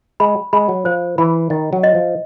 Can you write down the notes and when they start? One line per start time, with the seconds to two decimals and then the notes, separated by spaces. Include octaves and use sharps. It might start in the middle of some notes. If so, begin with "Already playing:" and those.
0.20 G#3 B5
0.53 G#3 B5
0.69 F#3
0.85 F3 C5
1.18 E3 B5
1.50 D#3 D#5
1.73 F#3
1.83 D#5
1.95 F3